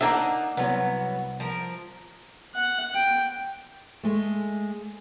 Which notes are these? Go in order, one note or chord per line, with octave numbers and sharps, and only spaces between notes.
A#3 D4 D#4 E5 F#5
C2 F#3 B3
F3 A#4
F#5
G5
G#3 A3